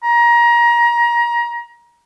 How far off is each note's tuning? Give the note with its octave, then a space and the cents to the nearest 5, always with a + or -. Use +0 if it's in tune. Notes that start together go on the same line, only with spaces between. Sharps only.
A#5 +25